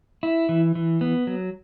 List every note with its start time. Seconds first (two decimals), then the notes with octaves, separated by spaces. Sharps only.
0.23 E4
0.49 E3
0.75 E3
1.01 B3
1.27 F#3